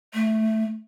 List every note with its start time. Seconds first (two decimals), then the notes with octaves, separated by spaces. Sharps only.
0.14 A3